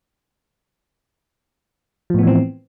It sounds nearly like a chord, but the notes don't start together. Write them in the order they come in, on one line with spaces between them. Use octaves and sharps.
F3 A2 B3 E3 C4